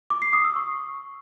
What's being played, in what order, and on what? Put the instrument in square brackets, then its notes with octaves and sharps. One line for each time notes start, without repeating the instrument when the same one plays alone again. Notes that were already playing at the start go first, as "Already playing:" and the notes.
[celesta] D6
C7
D#6
E6
C#6